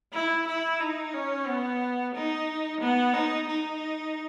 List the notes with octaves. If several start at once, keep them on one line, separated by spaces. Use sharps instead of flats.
E4
E4
D#4
C#4
B3
D#4
B3
D#4
D#4